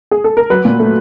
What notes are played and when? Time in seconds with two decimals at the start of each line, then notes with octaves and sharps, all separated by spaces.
0.11 G#4
0.24 A4
0.37 A#4
0.50 F#3 B4
0.65 A#2
0.79 A3